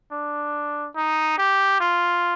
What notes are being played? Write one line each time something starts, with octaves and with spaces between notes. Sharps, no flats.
D4
D#4
G4
F4